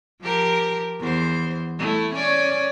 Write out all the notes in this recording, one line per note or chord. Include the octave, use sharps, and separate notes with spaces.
F3 G4 A#4
E2 C5
A3 E4
C#4 C#5 D5